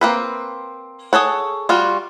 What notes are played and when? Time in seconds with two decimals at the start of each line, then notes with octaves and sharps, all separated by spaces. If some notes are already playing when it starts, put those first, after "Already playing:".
0.01 A#3 C4 B4
1.13 G#4 A4 C#5 F#5
1.69 G3 F4 F#4